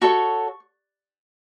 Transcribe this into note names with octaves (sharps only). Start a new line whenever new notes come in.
F#4 A4 C#5 C#6